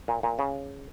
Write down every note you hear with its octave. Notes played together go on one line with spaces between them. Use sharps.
A#2
A#2
C#3